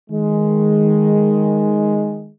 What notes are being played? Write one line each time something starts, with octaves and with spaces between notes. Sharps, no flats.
D#3 G#3